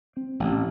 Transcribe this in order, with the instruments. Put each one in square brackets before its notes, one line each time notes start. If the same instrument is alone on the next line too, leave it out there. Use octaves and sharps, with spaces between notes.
[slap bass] C4
A1